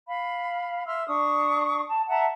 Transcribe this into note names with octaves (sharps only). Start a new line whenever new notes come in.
F5 B5
E5 C6 E6 F6
D4 C#6 D#6
A5
E5 F#5 A5 A#5